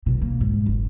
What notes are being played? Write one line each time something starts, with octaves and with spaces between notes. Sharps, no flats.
B1 B2
A#3
G#2
F#1